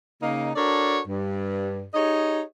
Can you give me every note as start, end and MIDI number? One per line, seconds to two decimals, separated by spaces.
0.22 0.50 49
0.22 0.50 58
0.22 0.50 63
0.55 0.99 62
0.55 0.99 66
0.55 0.99 69
0.55 0.99 70
0.55 0.99 73
0.55 0.99 74
1.07 1.83 43
1.94 2.41 63
1.94 2.41 67
1.94 2.41 68
1.94 2.41 73
1.94 2.41 75